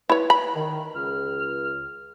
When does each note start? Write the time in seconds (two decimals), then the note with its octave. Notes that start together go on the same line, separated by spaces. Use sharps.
0.10 E4 B4 C#5
0.30 B5
0.55 D#3
0.95 C#2 F6